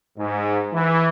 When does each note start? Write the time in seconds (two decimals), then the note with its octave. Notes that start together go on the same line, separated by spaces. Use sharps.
0.18 G#2
0.73 E3